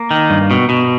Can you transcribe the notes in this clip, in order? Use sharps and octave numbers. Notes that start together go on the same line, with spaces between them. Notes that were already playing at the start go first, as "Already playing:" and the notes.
Already playing: A#3
D#3
G2
B2
B2